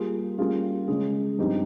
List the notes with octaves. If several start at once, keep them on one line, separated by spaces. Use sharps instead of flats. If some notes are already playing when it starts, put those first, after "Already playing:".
Already playing: G3 A#3 F4 G#4
G3 A#3 C#4 F4 G#4
C#3 G#3 C#4 G#4
G2 F3 C4 D#4 G4